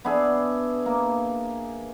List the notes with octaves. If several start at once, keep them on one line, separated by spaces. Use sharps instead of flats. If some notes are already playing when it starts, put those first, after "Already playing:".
B3 D4 G#4 E5
A#3